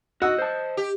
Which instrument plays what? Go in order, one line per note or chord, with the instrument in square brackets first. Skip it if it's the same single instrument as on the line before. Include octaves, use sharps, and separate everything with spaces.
[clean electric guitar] F#4 [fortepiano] D#5 F#5 E6
[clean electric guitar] C5 A5
[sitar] G4